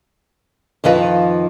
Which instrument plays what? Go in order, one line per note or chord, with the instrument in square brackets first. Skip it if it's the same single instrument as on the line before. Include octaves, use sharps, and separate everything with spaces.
[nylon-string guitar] F2 D#3 F3 B4 D#5